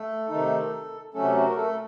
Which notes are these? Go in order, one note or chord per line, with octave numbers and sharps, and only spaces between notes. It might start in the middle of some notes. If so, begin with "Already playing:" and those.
Already playing: A3 A4
C3 D#3 A3 D#4
C3 F#3 A3 C#4 A4
F#4
A#4
A3 A4